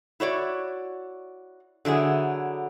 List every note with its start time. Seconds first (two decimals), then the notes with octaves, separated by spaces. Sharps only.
0.20 E4 F#4 C#5 D5
1.85 D3 F#3 E4 G#4